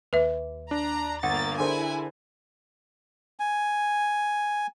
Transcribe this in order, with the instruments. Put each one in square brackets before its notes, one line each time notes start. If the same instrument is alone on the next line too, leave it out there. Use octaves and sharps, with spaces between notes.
[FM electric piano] D#2 [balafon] B4 E5
[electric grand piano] D4 [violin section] A#5
[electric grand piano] G1 [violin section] A#3 A6 [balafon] F#5
[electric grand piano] D3 [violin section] E4 G#5 [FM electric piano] G#4 A#4 C5
[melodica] G#5